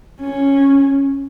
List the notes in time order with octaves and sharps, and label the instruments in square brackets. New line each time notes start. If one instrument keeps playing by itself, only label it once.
[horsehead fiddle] C#4